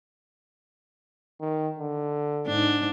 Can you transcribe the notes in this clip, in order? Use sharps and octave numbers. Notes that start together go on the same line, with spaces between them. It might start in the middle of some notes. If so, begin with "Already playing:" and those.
D#3
D3
G#2 D4